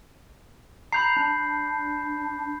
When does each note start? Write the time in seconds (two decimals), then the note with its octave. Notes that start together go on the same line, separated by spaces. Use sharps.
0.92 A#5 B5 G6 C7
1.16 D4